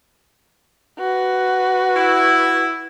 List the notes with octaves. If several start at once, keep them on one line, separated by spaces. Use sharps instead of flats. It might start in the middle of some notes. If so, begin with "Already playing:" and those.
F#4 B4
E4